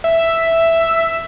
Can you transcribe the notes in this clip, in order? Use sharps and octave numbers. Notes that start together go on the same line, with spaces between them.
E5